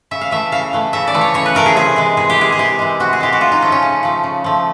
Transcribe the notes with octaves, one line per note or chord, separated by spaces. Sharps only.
C#3 E5
F5
E3 A3 E5
C#3 F5
E3 A3
C#3 E5
D5
E3 A3
C#5
C#3 C#5
B4
E3 A3 A#4
G#4
C3 G#4
E3 G#3
C3 G#4
G4
E3 G#3 G#4
G#4
C3 G4
E3 G#3
C3 F#4
G#4
E3 G#3 G4
F#4
C#3 F4
D#4
F3 A3 C#4
C#4
C#3
F3 A3
C#3
F3 A3